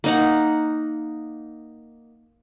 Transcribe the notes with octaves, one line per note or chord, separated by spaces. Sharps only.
A#3 D#4 F#5